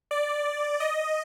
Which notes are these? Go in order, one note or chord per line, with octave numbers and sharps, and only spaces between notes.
D5
D#5